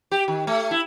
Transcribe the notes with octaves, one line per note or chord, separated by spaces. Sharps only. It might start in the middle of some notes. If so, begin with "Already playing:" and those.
G4
D#3
A3
E4